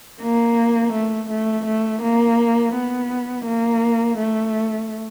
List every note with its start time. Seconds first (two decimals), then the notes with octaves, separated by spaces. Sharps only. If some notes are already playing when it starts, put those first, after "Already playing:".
0.21 A#3
0.93 A3
1.30 A3
1.66 A3
2.02 A#3
2.74 B3
3.46 A#3
4.18 A3